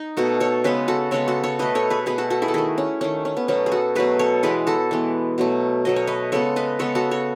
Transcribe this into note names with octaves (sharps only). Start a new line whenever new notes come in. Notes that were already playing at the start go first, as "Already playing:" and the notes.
Already playing: D#4
B2 A3 F#4 A4
A4 C#5
C#3 G#3 B3 G#4 B4
F#4 A4
C#3 G#3 B3 A4 C#5
F#4 A4
A4 C#5
B2 A3 B4 D#5
A4 C#5
G#4 B4
B2 A3 G#4 B4
F#4 A4
F#4 A4
E4 G#4
A4
D#3 A3 E4 G#4
C#4
D#3 A3 C#4
C#4
B3
B2 F#3 A3 C#4
G#4
F#4 A4
B2 F#3 A3 G#4 B4
A4 C#5
E3 G#3 B3 G#4 B4
F#4 A4
E3 G#3 B3
B2 F#3 A3
B2 F#3 A3 D#5
C#5
B4 D#5
C#3 G#3 B3 A4 C#5
B4 D#5
C#3 G#3 B3 A4 C#5
F#4 A4
A4 C#5